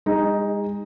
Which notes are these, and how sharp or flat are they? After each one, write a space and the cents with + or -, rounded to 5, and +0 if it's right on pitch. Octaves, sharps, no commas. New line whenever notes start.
G#3 -35 D#4 +5